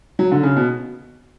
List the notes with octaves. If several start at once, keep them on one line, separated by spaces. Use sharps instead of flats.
F#3
D3
C#3
B2